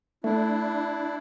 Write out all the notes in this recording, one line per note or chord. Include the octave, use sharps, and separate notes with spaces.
A3 D4 E4